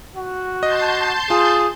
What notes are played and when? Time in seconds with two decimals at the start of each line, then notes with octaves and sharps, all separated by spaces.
0.16 F#4
0.63 D#5 A5 C6 G6
1.30 F4 G#4